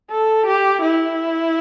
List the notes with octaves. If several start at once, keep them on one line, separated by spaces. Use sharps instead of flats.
A4
G4
E4